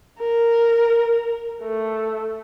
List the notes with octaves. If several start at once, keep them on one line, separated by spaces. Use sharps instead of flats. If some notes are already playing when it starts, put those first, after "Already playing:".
A#4
A3